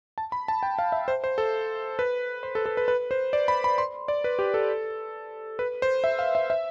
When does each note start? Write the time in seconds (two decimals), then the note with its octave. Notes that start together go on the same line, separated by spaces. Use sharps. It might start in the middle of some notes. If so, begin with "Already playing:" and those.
0.18 A5
0.32 B5
0.48 A5
0.63 G5
0.79 F5
0.92 E5
1.08 C5
1.24 C5
1.38 A4
1.99 B4
2.43 C5
2.55 A4
2.66 A4
2.77 B4
2.88 B4
3.11 C5
3.33 D5
3.48 B5
3.64 B5
3.78 C6
4.08 D5
4.24 B4
4.39 G4
4.54 A4
5.59 B4
5.82 C5
6.04 E5
6.19 F5
6.35 E5
6.50 E5